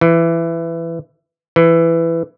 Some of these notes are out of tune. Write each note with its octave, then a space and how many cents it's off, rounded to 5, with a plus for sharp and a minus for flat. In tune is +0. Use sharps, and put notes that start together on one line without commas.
E3 +15
E3 +10